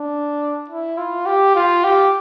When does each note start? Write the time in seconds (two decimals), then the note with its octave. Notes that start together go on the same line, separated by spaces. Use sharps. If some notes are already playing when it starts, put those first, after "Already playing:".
Already playing: D4
0.69 E4
0.98 F4
1.26 G4
1.55 F4
1.84 G4